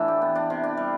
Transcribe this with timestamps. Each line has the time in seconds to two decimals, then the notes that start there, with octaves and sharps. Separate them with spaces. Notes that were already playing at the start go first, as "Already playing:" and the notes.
Already playing: A2 E3 D4 A4 E5
0.08 G4
0.22 B3
0.35 D4
0.50 C3
0.63 D4
0.77 G3